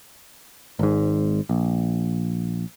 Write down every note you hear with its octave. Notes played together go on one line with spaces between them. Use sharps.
G#1 G#2
A#1